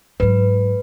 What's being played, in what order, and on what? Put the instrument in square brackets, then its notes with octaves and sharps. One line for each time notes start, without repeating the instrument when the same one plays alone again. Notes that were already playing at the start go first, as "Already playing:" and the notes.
[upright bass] G#2 F#3 [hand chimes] B4